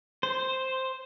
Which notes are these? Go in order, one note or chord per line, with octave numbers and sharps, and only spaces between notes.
C5